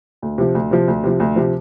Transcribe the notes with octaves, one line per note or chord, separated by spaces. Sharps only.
D2
C3 F3
D2
C3 F3
D2
C3 F3
D2
C3 F3